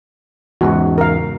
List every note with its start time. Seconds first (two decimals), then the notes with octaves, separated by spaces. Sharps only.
0.61 E2 G#2 C#3 F#4
0.98 A#4 F5